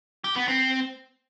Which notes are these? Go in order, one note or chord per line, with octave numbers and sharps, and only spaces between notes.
G4
B3
C4